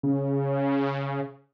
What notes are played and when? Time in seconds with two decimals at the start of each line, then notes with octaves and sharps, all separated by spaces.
0.03 C#3